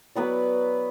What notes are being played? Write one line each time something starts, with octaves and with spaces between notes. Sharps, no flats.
F#3 B3 B4 D5